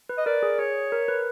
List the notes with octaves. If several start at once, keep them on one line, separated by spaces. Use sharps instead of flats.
B4
D#5
A#4 D5
G#4
G#4 C#5
A#4
B4